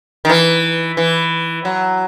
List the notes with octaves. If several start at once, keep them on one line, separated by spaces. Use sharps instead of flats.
D#3
E3
E3
F#3